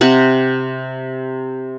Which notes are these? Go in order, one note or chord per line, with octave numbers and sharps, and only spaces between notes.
C3 F#5